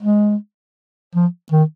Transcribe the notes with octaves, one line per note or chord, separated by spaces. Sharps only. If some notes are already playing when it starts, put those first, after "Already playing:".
G#3
F3
D#3